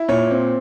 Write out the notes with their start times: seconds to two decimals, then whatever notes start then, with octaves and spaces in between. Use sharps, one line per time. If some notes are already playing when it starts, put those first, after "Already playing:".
Already playing: E4
0.09 A#2 C#5
0.31 C4